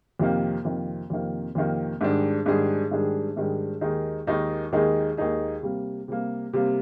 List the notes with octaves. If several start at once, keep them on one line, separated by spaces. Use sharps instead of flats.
F2 C3 D#3 A#3
F2 C3 D#3 A#3
F2 C3 D#3 A#3
F2 C3 D#3 A#3
G#2 D#3 G3 D4 G#4
G#2 D#3 G3 D4 G#4
G#2 D#3 G3 D4 G#4
G#2 D#3 G3 D4 G#4
D#2 D#3 G#3 D#4 G#4
D#2 D#3 G#3 D#4 G#4
D#2 D#3 G#3 D#4 G#4
D#2 D#3 G#3 D#4 G#4
C3 G3 A#3
C3 G3 A#3
C3 G3 A#3